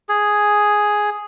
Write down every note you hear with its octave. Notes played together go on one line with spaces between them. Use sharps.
G#4